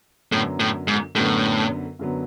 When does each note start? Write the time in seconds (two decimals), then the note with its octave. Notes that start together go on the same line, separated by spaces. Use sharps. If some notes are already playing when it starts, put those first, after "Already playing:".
0.32 F#2 A2 D3 F#3 B3
0.60 A2
0.88 G#2
1.15 F#2 A2 D3 F#3 B3
1.99 F#2 D3 F#3 B3